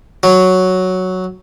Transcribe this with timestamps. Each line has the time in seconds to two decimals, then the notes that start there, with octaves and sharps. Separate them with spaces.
0.23 F#3